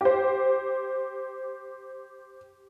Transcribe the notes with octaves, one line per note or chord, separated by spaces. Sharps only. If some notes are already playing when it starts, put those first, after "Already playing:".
G4 C5